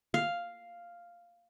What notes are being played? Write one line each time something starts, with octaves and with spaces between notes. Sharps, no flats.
F5